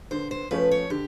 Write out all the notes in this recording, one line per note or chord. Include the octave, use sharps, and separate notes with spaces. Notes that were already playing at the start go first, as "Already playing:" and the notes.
D3 C5
C5
F3 A3 C#4 B4
C#5
D3 G4